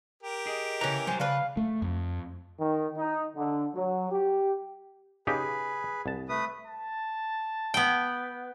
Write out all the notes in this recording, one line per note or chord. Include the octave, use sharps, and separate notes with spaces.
G4 A#4
G#4 D#5
C#3 E3 C#4 A#5
F#3 G3 C4 G#5
C#3 D4 B4 F5
A3
F2
D#3
D#4
D3
F#3
G4
C#3 D#4 G4 G#4 B4
C2 A5
A3 B4 D#6
A5
B3 G5